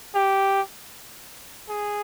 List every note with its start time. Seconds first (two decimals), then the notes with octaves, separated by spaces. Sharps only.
0.15 G4
1.69 G#4